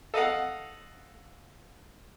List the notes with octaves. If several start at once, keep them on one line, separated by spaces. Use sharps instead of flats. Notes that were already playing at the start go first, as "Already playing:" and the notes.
A4 D#5 F5 F#5